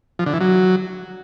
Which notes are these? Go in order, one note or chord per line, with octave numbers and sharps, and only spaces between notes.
F3
D3
E3
F#3